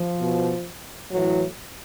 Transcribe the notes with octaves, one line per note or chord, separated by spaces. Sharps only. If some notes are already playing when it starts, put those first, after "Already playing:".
Already playing: F3
B2
A2 E3 F#3